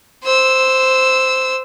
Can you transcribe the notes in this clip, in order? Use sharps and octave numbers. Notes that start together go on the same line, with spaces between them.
C5 E6